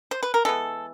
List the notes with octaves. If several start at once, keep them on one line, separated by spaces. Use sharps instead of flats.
C5
B4
A#4
E3 G#3 B3 A4